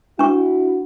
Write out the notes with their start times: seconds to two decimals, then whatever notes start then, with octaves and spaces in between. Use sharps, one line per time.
0.19 D4 E4 F#4 C#6